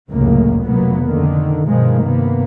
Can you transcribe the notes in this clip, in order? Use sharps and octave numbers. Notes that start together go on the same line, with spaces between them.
F1 C#2 F#2 A2 C#3 A#3
F1 B2 F#3 A#3 B3
F2 D3 D#3
G2 B2 D#3 F3 G#3
G2 C3 A#3 B3